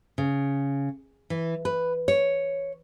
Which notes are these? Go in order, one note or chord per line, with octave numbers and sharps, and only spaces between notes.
C#3
E3
B4
C#5